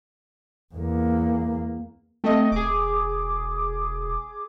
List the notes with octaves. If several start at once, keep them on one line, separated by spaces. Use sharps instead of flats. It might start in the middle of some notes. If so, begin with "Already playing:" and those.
E2 A#3
A3 C4 D#5
E1 G#4 D6